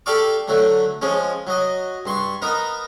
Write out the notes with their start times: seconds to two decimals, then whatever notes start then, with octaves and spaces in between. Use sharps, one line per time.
0.06 G4 A4 D5 F5 C#6 D6
0.48 D3 F#3 A3
1.02 F3 G#3 C#4
1.47 F#3 D#5
2.06 G2 C6 C#6
2.42 B3 D#4 A#4